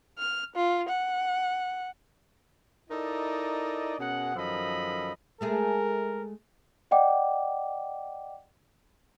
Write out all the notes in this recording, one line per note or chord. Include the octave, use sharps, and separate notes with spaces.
F6
F4
F#5
D#4 E4 A4 A#4 D5 D#5
B2 C#4 G#4 A#4 F#5
F#2 D#3 F3 A4 D#5 B5
G#3 A3 G#4 A#4
D5 D#5 F#5 G5 D6